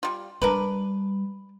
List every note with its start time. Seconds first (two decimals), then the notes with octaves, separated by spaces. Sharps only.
0.03 G3 F4
0.42 G3 D4 A#4 B4